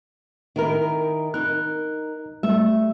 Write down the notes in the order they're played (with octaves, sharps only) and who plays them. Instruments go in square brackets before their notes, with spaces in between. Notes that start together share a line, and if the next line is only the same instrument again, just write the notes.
[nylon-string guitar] D#3 E4 A#4
[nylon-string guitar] D#4 A#4 [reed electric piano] F#6
[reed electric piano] G3 A3 [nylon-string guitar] E5